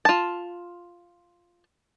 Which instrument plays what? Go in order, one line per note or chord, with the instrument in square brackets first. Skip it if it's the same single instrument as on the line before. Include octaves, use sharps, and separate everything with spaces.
[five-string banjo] F4 A5